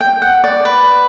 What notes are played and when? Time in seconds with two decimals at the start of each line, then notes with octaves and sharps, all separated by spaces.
0.01 G5
0.22 F#5
0.44 D5
0.65 B4